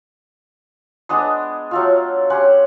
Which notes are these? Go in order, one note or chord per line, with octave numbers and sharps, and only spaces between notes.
G#3 B3 D4 D#6
F#3 A3 F4
C#4 G4 F#5 C6